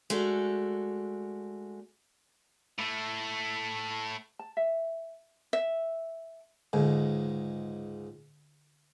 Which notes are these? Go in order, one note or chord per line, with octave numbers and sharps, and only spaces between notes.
G#3 A3 D4 F#4
A2 A3
A5
E5
E5
C#2 G#2 D3